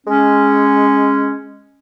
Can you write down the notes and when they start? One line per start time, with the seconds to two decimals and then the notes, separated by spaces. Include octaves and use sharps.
0.07 G#3 C#4